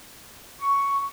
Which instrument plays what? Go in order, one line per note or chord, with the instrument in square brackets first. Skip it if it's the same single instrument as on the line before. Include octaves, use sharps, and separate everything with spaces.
[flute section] C#6